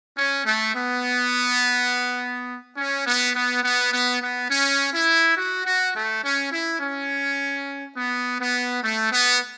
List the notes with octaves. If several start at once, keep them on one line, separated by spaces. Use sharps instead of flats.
C#4
A3
B3
C#4
B3
B3
B3
B3
B3
C#4
E4
F#4
F#4
A3
C#4
E4
C#4
B3
B3
A3
B3